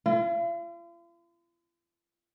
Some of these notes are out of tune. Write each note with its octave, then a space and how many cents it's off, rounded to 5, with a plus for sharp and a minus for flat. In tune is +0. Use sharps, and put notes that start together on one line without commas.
F4 -45